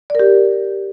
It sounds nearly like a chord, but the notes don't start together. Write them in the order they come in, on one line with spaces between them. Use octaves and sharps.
D5 A#4 G4